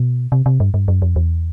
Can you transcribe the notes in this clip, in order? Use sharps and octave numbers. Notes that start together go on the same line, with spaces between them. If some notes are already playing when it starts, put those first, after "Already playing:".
Already playing: B2
C3
C3
G2
G2
F#2
F2
E2